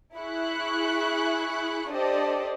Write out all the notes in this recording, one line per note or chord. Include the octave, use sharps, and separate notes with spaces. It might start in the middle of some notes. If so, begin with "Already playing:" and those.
E4 G#4 B5 C#6 F#6
D4 G4 A4 C5 D5 D#5